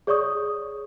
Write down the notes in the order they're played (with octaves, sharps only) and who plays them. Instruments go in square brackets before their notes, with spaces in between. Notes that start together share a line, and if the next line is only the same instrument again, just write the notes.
[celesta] G#4 C#5 D5 C#6 D#6